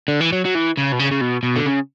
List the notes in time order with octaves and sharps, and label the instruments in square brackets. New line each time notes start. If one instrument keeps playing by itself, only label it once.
[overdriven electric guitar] D3
E3
F#3
F#3
E3
C#3
B2
C#3
C#3
B2
B2
D3
C#3